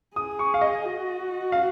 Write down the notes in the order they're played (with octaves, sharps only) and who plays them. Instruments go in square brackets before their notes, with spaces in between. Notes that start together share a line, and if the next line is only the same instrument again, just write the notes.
[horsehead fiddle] G#4 [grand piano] D#6
[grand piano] C#6
F5
D#5
[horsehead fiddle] F#4
[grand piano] F5